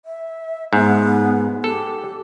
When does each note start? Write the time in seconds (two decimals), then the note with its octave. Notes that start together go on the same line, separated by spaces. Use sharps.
0.05 E5
0.73 G#2 B3
1.64 G4 A4